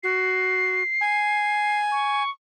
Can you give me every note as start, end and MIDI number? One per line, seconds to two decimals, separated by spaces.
0.03 0.83 66
0.03 1.79 96
1.01 2.23 80
1.92 2.30 85